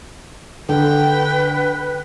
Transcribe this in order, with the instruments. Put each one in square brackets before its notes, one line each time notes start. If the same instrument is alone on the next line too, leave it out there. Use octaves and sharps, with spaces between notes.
[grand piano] D3 [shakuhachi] B4 [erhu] G5